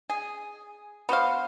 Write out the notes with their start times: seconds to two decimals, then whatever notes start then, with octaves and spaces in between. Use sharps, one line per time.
0.10 G#4
1.09 B3 F#4 C5 F5